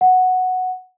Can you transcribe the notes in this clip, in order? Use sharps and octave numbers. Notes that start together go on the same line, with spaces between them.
F#5